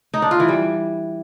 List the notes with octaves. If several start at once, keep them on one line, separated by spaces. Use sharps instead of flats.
D#4
D4
F4
E3
G3